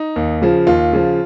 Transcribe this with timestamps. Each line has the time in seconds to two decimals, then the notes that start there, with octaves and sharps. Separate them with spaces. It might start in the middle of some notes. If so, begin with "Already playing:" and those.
Already playing: D#4
0.16 D#2
0.42 C#3 F3
0.67 D#2 F4
0.93 C#3 F3